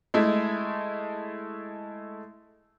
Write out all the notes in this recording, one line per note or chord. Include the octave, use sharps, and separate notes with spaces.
G#3 A3 E4